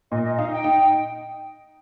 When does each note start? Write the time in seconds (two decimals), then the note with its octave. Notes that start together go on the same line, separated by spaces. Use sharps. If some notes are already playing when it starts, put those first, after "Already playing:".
0.12 A#2 D#5
0.25 D#5
0.38 D#4 F5
0.51 G5
0.64 D#4